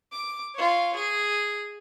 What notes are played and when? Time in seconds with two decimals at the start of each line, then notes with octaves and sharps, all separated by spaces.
0.12 D6
0.55 F4 C#5
0.95 G#4